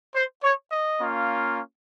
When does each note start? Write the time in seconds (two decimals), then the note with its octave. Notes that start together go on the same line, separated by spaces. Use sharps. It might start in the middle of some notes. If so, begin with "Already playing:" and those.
0.15 C5
0.43 C#5
0.72 D#5
1.00 A#3 C#4 F4